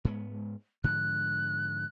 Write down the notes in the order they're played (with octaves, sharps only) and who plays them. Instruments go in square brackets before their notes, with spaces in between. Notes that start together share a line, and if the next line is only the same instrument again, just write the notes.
[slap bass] G#2 G#3 B3
[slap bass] G#2 D3 F3 [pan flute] F#6